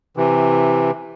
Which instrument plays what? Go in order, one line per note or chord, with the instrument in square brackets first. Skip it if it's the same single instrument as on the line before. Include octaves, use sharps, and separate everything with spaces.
[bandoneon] C3 E3